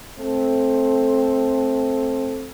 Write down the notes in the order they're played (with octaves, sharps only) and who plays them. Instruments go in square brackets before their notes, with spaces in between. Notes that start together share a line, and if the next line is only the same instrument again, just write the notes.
[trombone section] A3 C4 A4